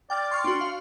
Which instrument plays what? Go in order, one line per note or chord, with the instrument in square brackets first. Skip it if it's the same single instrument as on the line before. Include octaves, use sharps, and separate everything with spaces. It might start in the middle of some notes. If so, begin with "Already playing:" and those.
[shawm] D5 [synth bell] G5 F6 A6
[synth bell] C6 C#6 F6
[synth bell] D4 F#4 [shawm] C6
[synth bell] F5